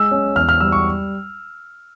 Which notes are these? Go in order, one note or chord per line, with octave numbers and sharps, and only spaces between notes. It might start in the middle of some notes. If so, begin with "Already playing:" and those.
Already playing: G#3 E6
C#4
E2 F6
F6
G3 E6
C#6